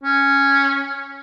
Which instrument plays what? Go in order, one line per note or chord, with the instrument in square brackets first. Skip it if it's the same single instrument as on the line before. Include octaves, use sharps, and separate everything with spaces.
[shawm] C#4